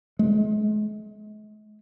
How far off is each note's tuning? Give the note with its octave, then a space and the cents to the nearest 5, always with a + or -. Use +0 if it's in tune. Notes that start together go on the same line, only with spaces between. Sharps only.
G#3 +45